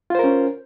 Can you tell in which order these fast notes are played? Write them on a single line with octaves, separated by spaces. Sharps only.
F4 C5 A#4 C#4